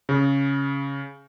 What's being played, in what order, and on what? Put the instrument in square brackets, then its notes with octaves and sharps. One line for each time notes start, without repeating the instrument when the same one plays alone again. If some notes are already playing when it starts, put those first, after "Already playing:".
[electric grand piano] C#3